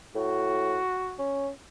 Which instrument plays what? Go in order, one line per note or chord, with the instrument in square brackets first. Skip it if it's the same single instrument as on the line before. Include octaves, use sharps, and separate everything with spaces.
[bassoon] A2 [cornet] F#4
[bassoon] C#4